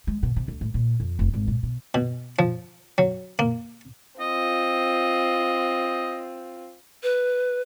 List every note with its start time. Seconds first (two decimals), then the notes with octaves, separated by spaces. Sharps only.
0.07 G#3
0.23 B2
0.36 C3
0.48 D2
0.61 A2
0.74 A#2
1.00 F2
1.19 F1
1.34 G#1
1.48 A#2
1.63 B2
1.95 B2
2.39 F3
2.98 F#3
3.39 A#3
4.20 C4 F4 D#5
7.03 B4